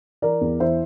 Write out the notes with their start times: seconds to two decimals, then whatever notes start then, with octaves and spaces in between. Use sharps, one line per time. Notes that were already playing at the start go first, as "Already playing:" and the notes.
0.22 E3 A#4 D5
0.41 E2
0.60 E3 C5 E5